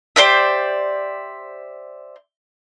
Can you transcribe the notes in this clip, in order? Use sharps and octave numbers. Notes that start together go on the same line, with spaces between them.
G4 C5 D5 E5